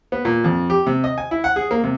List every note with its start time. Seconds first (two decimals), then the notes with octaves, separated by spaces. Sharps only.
0.12 B3
0.25 A#2
0.44 F2
0.70 G4
0.87 C3
1.04 D#5
1.18 G#5
1.31 E4
1.44 F#5
1.56 G#4
1.71 A#3
1.84 C3